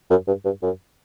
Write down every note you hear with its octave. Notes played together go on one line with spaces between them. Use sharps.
F#2
G2
G2
F#2